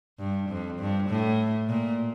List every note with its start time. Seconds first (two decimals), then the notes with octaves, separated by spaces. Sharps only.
0.19 G2
0.49 F2
0.79 G2
1.09 A2
1.69 A#2